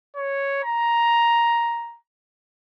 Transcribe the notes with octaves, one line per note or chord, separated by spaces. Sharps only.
C#5
A#5